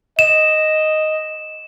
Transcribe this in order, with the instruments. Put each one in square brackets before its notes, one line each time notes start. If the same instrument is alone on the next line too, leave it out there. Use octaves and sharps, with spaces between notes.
[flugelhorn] D#5 [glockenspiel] E7